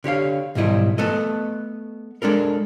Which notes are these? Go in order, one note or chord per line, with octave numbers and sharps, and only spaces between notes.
D3 G4 C#5 F5
B1 G#2 D#3 G3 E4 D#5
A3 B3 A4 D#5
G#3 D4 A4 A#4